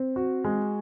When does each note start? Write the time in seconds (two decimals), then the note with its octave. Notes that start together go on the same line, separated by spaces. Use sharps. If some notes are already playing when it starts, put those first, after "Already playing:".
Already playing: C4
0.16 F#4
0.44 G#3